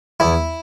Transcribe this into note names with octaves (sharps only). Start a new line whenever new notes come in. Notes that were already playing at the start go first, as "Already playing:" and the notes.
E2 E4